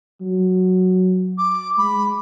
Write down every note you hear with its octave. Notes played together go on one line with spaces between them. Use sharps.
F#3
D6
G#3 B5